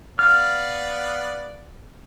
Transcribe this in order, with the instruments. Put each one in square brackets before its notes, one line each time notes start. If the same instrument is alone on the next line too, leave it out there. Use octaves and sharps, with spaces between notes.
[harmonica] B3 D5 F5 [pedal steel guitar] F6